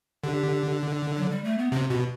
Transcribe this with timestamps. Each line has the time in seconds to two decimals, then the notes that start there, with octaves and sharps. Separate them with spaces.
0.24 D3 G4
1.16 F#3
1.30 G3
1.44 A3
1.58 B3
1.72 C3 C4
1.90 B2 F#4